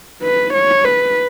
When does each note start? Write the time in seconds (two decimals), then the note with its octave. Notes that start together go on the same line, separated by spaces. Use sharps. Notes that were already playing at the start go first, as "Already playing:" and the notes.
0.23 B4
0.54 C#5
0.84 B4